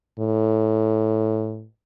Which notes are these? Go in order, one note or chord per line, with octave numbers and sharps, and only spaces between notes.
A2